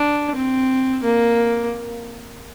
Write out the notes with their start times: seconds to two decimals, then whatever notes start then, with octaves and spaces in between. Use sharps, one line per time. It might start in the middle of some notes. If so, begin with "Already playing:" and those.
Already playing: D4
0.36 C4
1.04 A#3